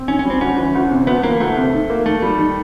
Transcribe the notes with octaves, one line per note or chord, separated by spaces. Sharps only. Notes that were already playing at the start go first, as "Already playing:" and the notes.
Already playing: C4
D#3 C#4
C#4
G3
C4
D2 C#4
E3
D2
C3
D2 B3
E3 A#3
D2 A3
C3
D#3
A#3
D#3 A3
G3
D#3